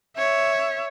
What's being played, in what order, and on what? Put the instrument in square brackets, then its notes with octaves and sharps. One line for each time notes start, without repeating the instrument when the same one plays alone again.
[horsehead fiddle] C#5 E5